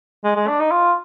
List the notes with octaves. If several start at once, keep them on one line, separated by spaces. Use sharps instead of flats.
G#3
G#3
D4
D#4
F4